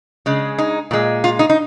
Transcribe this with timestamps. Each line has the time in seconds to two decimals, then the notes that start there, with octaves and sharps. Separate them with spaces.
0.26 C#3 G#3
0.58 D#4
0.91 A#2 G#3
1.24 F4
1.39 D#4
1.50 D#4